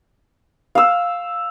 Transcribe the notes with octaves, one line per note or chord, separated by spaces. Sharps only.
F5 E6